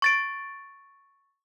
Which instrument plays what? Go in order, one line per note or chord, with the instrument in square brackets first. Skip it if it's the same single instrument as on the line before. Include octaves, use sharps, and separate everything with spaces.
[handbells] C#6 A6 D7